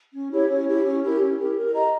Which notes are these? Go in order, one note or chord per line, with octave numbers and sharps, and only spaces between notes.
C#4
E4 G4 C#5
C#4
E4 G4 C#5
C#4
E4 G4 A#4
C#4
E4 G4 A#4
A#4
D#5 A#5